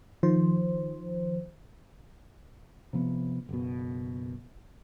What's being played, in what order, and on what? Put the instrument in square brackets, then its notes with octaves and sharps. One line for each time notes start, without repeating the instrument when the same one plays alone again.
[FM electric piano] D#3 F3 C5
[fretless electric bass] C3 F3 B3
F#1 B2